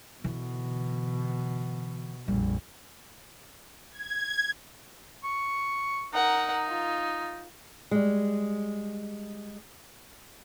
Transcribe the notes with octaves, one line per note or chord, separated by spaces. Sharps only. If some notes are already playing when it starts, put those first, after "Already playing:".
B2 D3 E3
A#1 F2 G3
G#6
C#6
D#4 A#4 F#5
F4
G3 G#3